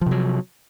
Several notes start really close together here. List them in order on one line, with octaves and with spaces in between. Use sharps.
F3 C3 F#3